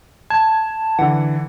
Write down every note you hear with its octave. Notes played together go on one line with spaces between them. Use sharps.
A5 G#6
D3 E3 F#5